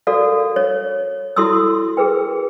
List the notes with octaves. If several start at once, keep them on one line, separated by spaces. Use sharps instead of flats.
F#4 A4 A#4 D5 F5
C#5
E4 F#4 A4 C6 D#6 E6
G#4 A#4 B4 G5